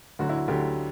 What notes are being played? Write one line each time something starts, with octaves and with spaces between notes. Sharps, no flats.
D2 D3 F#3 F#4
E4
D2 D3 F#3 G4